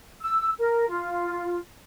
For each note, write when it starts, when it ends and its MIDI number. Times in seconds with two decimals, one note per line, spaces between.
0.21 0.51 88
0.60 0.86 70
0.88 1.57 65